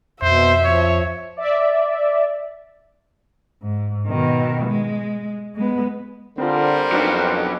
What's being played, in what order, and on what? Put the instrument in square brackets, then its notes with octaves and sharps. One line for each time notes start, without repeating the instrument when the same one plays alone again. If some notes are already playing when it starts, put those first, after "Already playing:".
[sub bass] F2 [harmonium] B2 [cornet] C5 [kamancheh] E5
[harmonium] F3 [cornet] C#5
[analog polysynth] D5 E5
[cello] G#2
B2 D#3
G#3
G#3 B3
[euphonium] D3 [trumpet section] G3 A#4 C5 [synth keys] C4 F4
[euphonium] F2 [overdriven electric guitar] B2 F#3 [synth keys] D4 D#4 B4